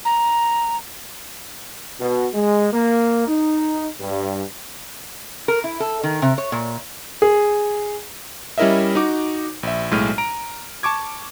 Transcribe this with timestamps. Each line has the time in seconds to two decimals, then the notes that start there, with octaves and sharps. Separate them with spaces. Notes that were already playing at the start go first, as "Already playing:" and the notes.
0.05 A#5
2.00 B2
2.34 G#3
2.73 A#3
3.28 D#4
3.99 G2
5.48 A#4
5.64 E4
5.80 A4
6.03 D#3
6.22 C3
6.38 C#5
6.52 A#2
7.22 G#4
8.58 G3 C#4 E4 A#4 D#5 E5
8.95 D#4 F#4 D6
9.63 A#1 E5
9.91 B1 A2 G#3 F6 D#7
10.18 A#5 D7
10.83 A5 C#6 D6 G#6